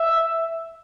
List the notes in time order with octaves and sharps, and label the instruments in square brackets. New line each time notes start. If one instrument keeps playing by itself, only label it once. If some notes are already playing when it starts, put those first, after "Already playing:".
Already playing: [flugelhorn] E5